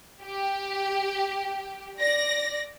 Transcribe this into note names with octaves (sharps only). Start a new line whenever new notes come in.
G4
D5 A#6